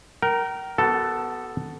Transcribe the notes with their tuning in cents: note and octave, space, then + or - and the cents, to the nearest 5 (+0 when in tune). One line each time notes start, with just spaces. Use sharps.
A#4 +0 G5 -40
B3 +0 F#4 +40 A4 +0